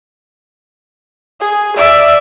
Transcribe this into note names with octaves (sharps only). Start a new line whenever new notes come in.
G#4
D5 E5